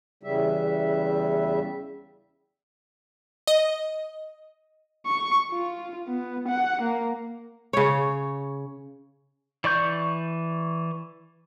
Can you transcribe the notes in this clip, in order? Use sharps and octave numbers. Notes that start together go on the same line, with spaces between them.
E2 C#3 G3 E5
D#5
C#6
F4
B3
F#5
A#3
C#3 C#5
E3 D5 C#6 G6